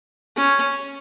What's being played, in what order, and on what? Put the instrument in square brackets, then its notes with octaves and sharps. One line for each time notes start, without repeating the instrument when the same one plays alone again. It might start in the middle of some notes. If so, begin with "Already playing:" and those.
[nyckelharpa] C#4